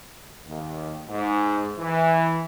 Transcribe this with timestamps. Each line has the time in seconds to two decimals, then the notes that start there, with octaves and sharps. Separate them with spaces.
0.47 D#2
1.09 G#2
1.78 E3